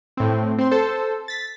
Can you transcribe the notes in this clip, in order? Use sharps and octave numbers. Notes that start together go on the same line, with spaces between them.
A2 C4
C4 C6
A4 C5
A6 B6